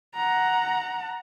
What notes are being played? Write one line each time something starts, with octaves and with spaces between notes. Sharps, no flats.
F#5 A#5